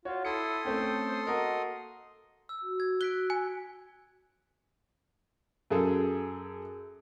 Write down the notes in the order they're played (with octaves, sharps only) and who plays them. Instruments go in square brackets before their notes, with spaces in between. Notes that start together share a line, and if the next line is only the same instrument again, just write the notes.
[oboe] F4 [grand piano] F#4 C#5
[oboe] E4 [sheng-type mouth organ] A4 C6 D#6 [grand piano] C#7
[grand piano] A3 C4 C#4 [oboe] G5
[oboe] C5
[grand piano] A#3 F#4 A#4 [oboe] D#5
[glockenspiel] E6
[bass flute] F#4
[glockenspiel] G#6
[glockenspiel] F#6 B6 D7 [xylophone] G7
[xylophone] G#5
[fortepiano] F#2 G#4 A4